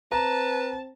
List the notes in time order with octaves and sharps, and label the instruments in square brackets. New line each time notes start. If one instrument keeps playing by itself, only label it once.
[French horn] C4 [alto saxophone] B4 [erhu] A5 [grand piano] A#5